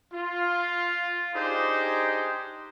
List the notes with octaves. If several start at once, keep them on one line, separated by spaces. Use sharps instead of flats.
F4
D4 D#4 G4 G#4 C5